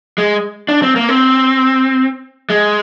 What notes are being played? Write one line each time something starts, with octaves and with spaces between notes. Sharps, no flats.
G#3
D4
C4
A#3
C4
G#3